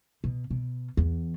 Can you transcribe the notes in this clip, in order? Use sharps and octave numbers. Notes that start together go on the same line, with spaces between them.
B2
B2
E2